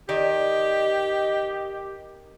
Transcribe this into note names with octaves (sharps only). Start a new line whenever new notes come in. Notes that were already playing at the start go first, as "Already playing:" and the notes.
D#3 G4 D5 D#5